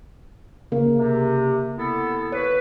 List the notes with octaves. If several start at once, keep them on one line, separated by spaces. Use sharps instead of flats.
C#3 A#3 A#4
C3
B3 E4 A4
B4 C#5